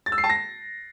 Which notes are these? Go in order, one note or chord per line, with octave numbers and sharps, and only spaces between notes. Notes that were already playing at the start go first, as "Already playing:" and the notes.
A6
E6
C7
A5
A#6